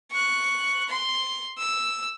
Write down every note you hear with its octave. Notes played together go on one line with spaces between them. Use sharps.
C#6 F#6
C6
E6